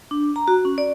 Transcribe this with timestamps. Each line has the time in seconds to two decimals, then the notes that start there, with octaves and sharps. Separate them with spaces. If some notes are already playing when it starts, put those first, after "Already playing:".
0.11 D4
0.36 A#5
0.48 F#4
0.65 C#4
0.78 D5